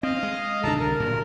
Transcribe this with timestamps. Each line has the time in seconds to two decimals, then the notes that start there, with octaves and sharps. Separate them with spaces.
0.03 C4 D#5 F5
0.23 G#3
0.63 B1 D3 D4 A4 A5 A#5
0.80 C2 D3 A#4
1.00 D1 G2 A#2